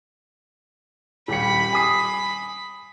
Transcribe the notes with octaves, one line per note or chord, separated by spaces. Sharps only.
D#1 G5 B5 C#7
G#5 D#6 C7